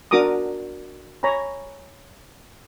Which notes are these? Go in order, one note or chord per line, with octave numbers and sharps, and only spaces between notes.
D4 F#4 A#4 A#5 D6 D#6
C#5 G#5 A#5 B5